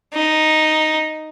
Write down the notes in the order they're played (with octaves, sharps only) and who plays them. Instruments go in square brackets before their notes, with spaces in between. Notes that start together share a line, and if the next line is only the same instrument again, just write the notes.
[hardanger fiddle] D#4